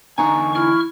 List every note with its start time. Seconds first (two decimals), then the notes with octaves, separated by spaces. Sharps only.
0.18 E2 D3 D#4 F#5 G#5 A#5 C#6
0.55 E4 C#6 F6